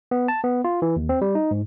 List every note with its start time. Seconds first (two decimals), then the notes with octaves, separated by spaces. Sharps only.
0.11 B3
0.28 A5
0.44 B3
0.64 F4
0.82 E3
0.96 D#2
1.09 C4
1.22 G3
1.35 D#4
1.51 G#2